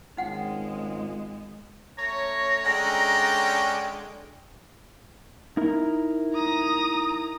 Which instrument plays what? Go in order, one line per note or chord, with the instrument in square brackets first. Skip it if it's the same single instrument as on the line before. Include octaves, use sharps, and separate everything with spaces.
[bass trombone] G#1 [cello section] G#3 [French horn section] C#4 F4 [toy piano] D#4 F#5 G5
[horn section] A3 C#4 C#5 [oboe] A#5
[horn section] D3 G#3 [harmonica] C#4 D4 G5
[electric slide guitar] D#4 E4 A#4
[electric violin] A#5 D#6